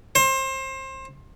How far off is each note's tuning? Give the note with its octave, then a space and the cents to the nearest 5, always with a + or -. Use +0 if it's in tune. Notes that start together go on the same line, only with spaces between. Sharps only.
C5 +25